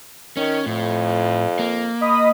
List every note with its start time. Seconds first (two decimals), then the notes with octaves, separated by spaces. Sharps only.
0.37 D#3 C#4
0.66 F2 A2
1.59 A#3
2.01 D#5 B5 D#6